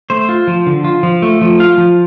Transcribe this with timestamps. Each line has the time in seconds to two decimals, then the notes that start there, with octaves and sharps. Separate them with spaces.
0.10 A3 C5
0.29 F4
0.47 F3
0.67 D3
0.84 F4
1.03 F3
1.22 A3
1.41 F3
1.60 F4 F5
1.78 F3